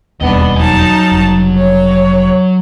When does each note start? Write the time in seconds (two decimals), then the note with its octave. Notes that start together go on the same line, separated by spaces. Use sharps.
0.21 E1 D#2 G3 B3 D4 D#5
0.56 F#3 D#4 G#5 A5
1.11 F1 G3
1.57 C#5